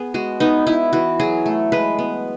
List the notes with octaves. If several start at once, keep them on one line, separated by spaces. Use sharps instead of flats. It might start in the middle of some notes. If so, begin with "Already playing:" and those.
Already playing: B3 G#4
G#3 F#4
B3 D#4
B3 E4
E3 F#4
F#3 G#4
A3
G#3 B4
B3